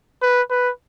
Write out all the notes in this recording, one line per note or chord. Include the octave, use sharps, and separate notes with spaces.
B4
B4